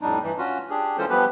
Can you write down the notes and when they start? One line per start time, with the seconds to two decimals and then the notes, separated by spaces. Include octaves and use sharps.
0.01 F2 A2 G3 D4 D#4
0.22 G2 E3
0.38 C#4 F4 F#4
0.70 D4 G4 G#4
0.98 E3 G#3 C#4 F4 A4 C5
1.09 F3 G3 B3 G4 B4